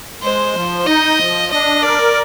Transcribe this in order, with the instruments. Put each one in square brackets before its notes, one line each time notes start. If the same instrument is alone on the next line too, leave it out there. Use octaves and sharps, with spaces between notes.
[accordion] G#3 [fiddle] C5
[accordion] F3
[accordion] D#4 [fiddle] D#5
[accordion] F3
[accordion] D4 [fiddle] D#5
[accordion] A#4 [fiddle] D5